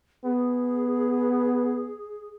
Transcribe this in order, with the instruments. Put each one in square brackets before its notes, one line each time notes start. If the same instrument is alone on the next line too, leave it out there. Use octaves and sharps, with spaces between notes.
[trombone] B3 [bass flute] G#4